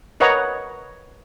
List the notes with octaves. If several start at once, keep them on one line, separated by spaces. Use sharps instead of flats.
A#4 B4 C#5 D#5 F#5 A#5